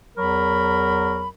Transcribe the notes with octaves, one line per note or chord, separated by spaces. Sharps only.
E2 F#3 A#4 B5